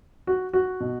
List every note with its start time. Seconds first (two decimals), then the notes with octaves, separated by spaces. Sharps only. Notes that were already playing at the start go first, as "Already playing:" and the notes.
0.27 F#4
0.53 F#4
0.80 B2